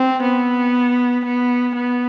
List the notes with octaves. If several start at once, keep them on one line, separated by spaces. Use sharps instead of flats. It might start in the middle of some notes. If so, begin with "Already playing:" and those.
Already playing: C4
B3
B3
B3